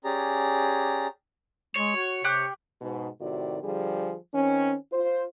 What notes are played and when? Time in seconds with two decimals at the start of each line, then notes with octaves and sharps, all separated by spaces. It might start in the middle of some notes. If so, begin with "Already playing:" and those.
0.04 C#4 G4 G#4 D5 A#5
1.76 G#3 C#5
1.96 F#4
2.24 C3 G4 F#6
2.81 G#2 B2
3.21 A2 C3 D#3 F#4 D5
3.63 D3 F3 G3 G#4
4.33 D#3 C4 C#4
4.92 F4 C5